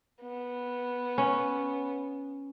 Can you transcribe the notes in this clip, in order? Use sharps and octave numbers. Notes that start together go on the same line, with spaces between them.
B3
C#4